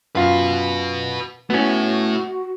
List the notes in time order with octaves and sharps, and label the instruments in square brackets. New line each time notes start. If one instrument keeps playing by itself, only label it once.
[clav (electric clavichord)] F#2 F4 [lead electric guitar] F#4 B4
[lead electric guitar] A3 E4 [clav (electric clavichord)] B3 C#4 [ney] F#4